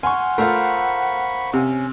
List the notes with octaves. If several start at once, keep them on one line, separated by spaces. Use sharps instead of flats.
F#5 G#5 C6 C#6 F6
A3 F4 A#4 C5 F5 B5 C#6
C3 C#4